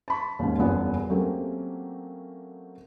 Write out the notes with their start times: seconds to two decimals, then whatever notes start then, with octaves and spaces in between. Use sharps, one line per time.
0.08 A5 B5 C#6
0.39 D#2 G#2 C#4
0.58 F#1 E2 G2 B3 C#4 F4
1.10 F#3 A3 A#3 C4 C#4 G4